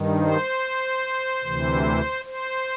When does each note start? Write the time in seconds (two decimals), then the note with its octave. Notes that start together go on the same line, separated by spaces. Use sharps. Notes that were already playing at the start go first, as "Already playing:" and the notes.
Already playing: G2 D#3
0.20 C5
1.43 D2 C3 E3
2.25 C5